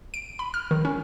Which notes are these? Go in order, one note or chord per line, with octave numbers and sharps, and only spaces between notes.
D7
B5
F6
D#3
C#4